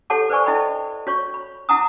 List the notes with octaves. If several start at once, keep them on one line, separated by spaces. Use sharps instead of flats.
G4 A4 C#5 F#5 A5 D6
B4 C5 D5 G#5 C#6
E4 A4 D#5 G5 B5
F#4 C#5 C#6
B5
E4 F#5 A5 A#5 D6 D#6